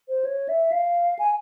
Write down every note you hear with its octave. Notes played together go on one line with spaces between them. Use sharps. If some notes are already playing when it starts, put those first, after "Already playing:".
C5
C#5
E5
F5
G#5